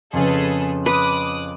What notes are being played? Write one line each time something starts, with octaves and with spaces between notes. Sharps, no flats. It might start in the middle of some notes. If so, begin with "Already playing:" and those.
F2 C#3 G#4 A4 B4
B4 D6 D#6 F#6